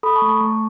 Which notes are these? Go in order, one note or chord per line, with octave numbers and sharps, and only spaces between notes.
A4 B5 D#6
A5 C#6
A3
A5 C#6
A3